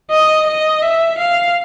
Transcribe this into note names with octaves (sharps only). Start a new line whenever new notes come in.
D#5
D#5
E5
F5